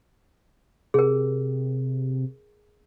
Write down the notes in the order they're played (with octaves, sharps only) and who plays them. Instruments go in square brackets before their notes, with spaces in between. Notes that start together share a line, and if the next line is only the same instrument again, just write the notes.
[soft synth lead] C3 [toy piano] G#4 A#4